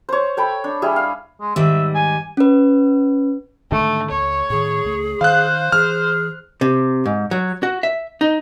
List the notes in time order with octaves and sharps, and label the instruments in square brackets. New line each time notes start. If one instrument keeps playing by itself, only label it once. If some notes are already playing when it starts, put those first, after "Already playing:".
[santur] C5 C#5
A4 G5 B5
D4
G3 E4 G#4
F5
[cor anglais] G#3
[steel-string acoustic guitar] G#2 D#3 G3 [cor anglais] E5
[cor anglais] G#5
[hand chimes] C#4 B4
[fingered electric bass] G#2 D3 D#3 [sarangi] A3
[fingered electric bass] C#2 [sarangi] C#5
[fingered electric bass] A2 D#3 [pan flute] G#4
[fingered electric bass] C#2 A3
[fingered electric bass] D#3 [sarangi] C5 [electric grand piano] F5 F#6
[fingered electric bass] E3 [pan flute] G#4 [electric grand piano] F6
[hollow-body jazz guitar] C3
G#2
F#3
F#4
E5
D#4